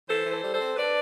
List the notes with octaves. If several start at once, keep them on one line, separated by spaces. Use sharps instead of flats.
E3 A4 C5
E3
A4 C5
G3
A4 C5
C4
D4 B4 D5